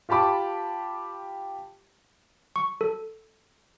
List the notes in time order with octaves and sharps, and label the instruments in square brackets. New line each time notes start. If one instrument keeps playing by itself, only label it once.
[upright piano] F4 G4 A5 B5 D6
[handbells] C#6
A4